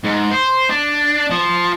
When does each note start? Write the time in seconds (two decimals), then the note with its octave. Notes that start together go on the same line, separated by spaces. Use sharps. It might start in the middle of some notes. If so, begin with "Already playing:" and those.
0.04 G#2
0.31 C5
0.69 D4
1.30 F3